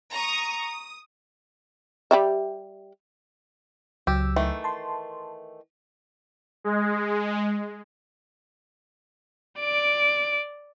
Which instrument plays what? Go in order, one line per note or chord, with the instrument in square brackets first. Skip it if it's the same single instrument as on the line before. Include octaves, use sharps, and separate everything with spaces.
[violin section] A#5 C#6 D#6
D#6
[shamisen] G3 G4 E5
[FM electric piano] C#2 F#3 E6 [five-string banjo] G4
[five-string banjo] D#3 E3 A3
[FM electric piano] A5 C6
[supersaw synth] G#3
[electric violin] D5 D7